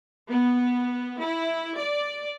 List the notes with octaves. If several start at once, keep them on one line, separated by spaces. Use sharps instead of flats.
B3
E4
D5